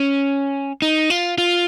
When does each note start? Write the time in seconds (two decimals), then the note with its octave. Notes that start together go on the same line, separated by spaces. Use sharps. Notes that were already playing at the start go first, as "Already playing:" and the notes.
Already playing: C#4
0.82 D#4
1.10 F4
1.38 F4